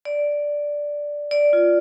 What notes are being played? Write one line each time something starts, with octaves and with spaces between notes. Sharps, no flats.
D5
D5
F4